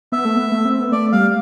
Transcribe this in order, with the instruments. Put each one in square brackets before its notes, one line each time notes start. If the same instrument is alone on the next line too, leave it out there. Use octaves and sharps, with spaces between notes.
[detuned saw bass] B3 [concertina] E5
[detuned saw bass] A3
B3
A3
C4
B3
[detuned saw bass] A3 [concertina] D5
[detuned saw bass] G3 [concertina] F5